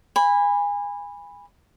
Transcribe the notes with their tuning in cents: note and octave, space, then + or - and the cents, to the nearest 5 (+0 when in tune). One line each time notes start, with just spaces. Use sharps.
G#5 -25 B5 +0